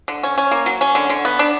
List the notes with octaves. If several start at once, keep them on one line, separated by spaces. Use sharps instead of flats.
D3
C#4
C#4
A#3
F#3
C#4
D3
D3
B3
D4